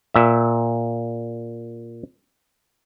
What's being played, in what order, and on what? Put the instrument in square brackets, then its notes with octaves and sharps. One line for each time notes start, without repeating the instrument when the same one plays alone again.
[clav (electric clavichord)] A#2 E5